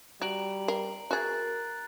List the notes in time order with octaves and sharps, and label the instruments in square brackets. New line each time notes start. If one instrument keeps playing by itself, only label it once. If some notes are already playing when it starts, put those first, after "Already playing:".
[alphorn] G3 [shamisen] F#4 [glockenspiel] A#5 D7 F#7
[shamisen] A#4 [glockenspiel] C7
[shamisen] F#4 G#4 [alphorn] A#4 [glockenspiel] A#5 F#6 A6